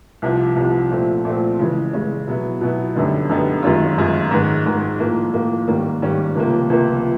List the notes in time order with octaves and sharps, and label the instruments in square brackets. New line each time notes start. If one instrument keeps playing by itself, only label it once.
[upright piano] C2 C3 F3
C2 C3 F3
A#2 F3 A3 C4
A#2 F3 A3 C4
C#3 E3 G#3 C#4
C#3 E3 G#3 C#4
B2 F#3 B3 E4
B2 F#3 B3 E4
F#2 D3 G3 B3 D#4
F#2 D3 G3 B3 D#4
F#2 D#3 G#3 C#4 F4
F#2 D#3 G#3 C#4 F4
G#2 D#3 G#3
G#2 D#3 G#3
A2 F3 A#3
A2 F3 A#3
G#2 D#3 G3 A#3 C#4
G#2 D#3 G3 A#3 C#4
C#2 C3 F3 A#3
C#2 C3 F3 A#3